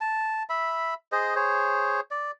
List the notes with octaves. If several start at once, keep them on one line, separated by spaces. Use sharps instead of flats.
A5
E5 B5
G#4 C5 D#5
G#4 C5 C#5
D5